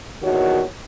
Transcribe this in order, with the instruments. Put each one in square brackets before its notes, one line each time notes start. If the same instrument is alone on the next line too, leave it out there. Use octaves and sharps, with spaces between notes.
[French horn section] E2 A#2 D#3 F#4 C#5